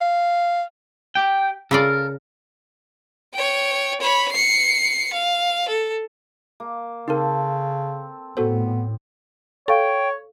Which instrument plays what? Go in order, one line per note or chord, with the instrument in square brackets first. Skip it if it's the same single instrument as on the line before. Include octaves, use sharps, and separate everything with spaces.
[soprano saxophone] F5
[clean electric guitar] G4 G5
[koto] C#3 F4 D5 [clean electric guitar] A4 A#4
[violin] C#5 G5
C#5 B5
C7 C#7
F5
A4
[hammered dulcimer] A#3
[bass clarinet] C#3 [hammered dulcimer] C4 A4 [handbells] D#4 A#4
[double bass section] A2 [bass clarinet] B3 [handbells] F#4 A4 C5
[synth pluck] A4 [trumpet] C#5 [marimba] F5 C#6 [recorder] G5